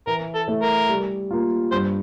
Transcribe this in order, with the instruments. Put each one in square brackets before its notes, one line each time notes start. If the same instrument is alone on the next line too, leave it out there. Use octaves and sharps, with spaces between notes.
[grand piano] E3 [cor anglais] A#4
[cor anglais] A4
[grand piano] A3 E4 A4
[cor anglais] A#4
[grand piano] G3
A#3 F4
[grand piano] G2 [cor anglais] C5